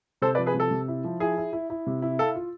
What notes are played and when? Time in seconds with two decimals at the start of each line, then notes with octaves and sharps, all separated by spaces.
0.22 C3 A4 C5
0.35 B4 D5
0.38 F3
0.46 G#4 B4
0.54 C3
0.60 A4
0.71 C3
0.88 E4
1.04 F3
1.20 E4 G#4
1.37 E4
1.53 E4
1.70 E4
1.87 C3
2.02 E4
2.19 A4 F5
2.36 F4